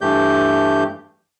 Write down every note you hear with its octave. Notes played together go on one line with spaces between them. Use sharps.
G2 E3 A3 G4 G6